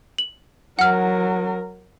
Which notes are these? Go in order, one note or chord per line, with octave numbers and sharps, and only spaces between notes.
F#7
F#3 A#4 F#5 F6